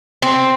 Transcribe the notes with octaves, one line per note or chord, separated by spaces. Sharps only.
C4